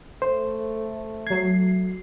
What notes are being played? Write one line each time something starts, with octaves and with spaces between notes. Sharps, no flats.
A3 C5
F#3 G#6 C7